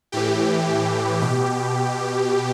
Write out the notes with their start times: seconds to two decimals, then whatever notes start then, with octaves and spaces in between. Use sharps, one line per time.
0.12 A2 E3 G4
1.22 B2 G4